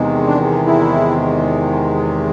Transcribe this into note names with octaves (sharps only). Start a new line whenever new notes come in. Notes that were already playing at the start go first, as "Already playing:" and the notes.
Already playing: E2 C3 D#3 G#3
D4
E4